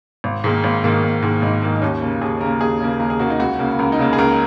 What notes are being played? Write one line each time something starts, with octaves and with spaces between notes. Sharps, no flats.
G#1
G#2 D#3 A#3
G#1
G#2 D#3 A#3
G#1
G#2 D#3 A#3
G#1 D#4
G#2 D#3 A#3
D#4
D#2 C#4
C#3 A#3
D#2 G#4
C#3 A#3 A#4
D#2 G#4
C#3 A#3
D#2 A#4
G#4
C#3 A#3 F#4
D#4
C#2 F#4
C#3 A#3
C#2 A#4
D#4
C#3 A#3
G#4
C#2 A#4